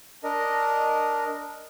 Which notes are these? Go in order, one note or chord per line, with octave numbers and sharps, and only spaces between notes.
D4 A#4 D#5